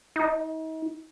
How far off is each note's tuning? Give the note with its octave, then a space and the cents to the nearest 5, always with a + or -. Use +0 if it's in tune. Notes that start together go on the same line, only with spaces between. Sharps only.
D#4 +40